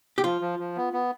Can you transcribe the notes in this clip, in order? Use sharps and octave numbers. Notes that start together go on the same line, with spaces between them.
G4
F3 F4
F3
F3
B3
B3